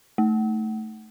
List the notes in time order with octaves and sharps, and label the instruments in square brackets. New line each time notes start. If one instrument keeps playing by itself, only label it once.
[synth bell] A3